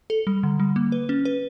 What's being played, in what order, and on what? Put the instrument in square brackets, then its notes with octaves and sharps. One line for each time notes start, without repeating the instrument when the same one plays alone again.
[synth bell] A4
G3
D3
G3
A#3
B4
C#4
B4